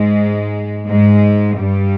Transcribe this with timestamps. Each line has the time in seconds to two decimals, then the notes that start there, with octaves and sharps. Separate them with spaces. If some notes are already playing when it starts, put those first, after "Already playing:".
Already playing: G#2 G#3
0.88 G#2 G#3
1.58 G2 G3